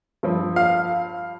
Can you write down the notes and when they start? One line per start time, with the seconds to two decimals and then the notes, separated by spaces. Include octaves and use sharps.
0.23 G2 F3
0.56 F5